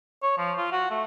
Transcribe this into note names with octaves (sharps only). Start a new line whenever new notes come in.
C#5
F3
F4
F#4
A3